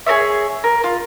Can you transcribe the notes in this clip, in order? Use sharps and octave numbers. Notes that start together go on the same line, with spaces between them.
G#4 A#4 C#5 E5
A#4
F4